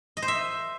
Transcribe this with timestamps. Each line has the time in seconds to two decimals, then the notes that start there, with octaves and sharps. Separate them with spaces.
0.17 D#5
0.22 C5
0.28 E5